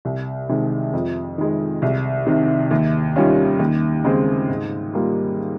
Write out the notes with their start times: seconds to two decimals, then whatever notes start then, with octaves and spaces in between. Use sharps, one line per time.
0.05 C2
0.49 C3 D#3 G#3
0.93 F2
1.38 D#3 G#3
1.82 C2
2.27 C3 D#3
2.71 D#2
3.16 D#3 G3 C#4 F4
3.59 D#2
4.04 C#3 G#3 C4
4.49 G#2
4.94 G3 A#3 F4